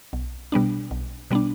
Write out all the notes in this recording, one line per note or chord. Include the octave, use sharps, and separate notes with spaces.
B1
B2 G3 B3 D4
B1
B2 G3 B3 D4